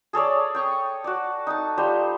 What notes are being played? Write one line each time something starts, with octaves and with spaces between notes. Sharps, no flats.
G#4 A4 C#5 D5
G5 C#6 D#6
F#4 D5
D#4 A5
G3 F4 C5